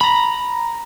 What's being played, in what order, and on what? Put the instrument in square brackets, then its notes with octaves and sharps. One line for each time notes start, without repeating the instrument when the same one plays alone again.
[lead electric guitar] A#5 B5